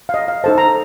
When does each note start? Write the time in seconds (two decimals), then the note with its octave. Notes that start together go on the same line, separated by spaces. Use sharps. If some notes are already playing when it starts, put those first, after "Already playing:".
0.09 F5
0.14 D#5
0.28 F5
0.44 D#4 A4 C5 A5
0.58 A#5